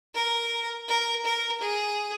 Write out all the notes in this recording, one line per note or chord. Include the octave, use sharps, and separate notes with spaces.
A#4
A#4
A#4
G#4